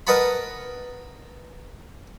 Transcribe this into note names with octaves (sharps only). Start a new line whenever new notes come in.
A#4 B4 D#5 F#5 A5 B5